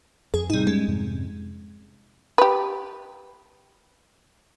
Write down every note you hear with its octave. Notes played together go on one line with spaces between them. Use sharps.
F2 G#4
A2 C3 G3 D#4
G#3 C#4
F2 G#2 C3
G4 B4